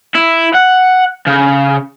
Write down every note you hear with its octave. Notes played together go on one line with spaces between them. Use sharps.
E4
F#5
C#3